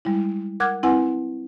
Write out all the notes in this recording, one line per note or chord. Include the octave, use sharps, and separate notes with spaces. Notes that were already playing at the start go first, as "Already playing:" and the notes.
G3 G#3 E4
A#4 F#5 D6 F6 F#6 G#6
C4 E4 B4 F#5 G#5